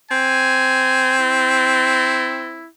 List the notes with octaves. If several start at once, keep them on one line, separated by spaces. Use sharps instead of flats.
C4 G#5
E4